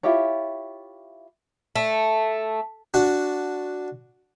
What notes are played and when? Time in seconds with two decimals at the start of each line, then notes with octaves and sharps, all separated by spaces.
0.03 E4 F4 G4 C#5
1.76 A3
2.94 D4 F#4